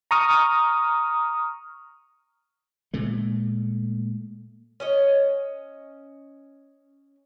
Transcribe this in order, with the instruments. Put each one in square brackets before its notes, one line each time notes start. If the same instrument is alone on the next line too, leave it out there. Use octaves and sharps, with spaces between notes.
[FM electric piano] A#5 C#6 D#6 F6
[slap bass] A#2 G#3 A3
[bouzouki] C#4 C#5 D#5